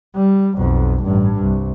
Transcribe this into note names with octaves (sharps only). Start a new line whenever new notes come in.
G3
B1 F2
A1 G2
C2